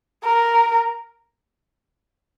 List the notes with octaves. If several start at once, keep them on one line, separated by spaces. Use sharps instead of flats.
A#4